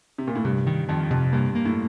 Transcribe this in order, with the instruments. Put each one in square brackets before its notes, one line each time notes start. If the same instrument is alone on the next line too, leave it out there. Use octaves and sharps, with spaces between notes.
[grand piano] C3
A#2
A2
[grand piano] G2 [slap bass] C3
[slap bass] D#3
[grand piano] F2 [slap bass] D#3
[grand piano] F2 [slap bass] C3
[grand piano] G2 [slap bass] A#3
[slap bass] A#3
[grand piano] A2